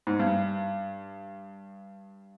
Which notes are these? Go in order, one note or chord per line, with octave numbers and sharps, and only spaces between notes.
G#2
G2